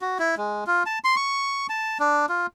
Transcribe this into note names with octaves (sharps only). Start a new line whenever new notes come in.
F#4
E4
G#3
F4
A5
C6
C#6
A5
D4
F4